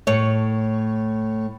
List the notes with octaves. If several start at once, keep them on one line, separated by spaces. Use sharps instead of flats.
A2 C#5